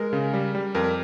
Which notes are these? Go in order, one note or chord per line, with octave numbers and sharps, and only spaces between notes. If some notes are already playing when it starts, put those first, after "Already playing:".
Already playing: G#3 A#4
C#3
G3
G3
F2 A#4